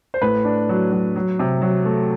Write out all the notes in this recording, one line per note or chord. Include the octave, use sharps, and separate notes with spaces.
C5
A2 B4
D4
F#3
F#3
F#3
C3
F#3
A3